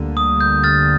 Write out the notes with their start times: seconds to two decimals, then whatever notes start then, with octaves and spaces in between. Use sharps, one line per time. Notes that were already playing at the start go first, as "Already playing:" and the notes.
Already playing: D2 D3 G3 A#3
0.17 D#6
0.41 G6
0.64 F6 A6